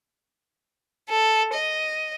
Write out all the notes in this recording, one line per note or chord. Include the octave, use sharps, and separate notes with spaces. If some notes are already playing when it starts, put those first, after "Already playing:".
A4
D#5